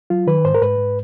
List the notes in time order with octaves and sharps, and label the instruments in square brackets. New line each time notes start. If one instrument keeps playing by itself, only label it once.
[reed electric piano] F#3 F4
D#3 B4
G#2 C5
A#4
G#2 B4
G#2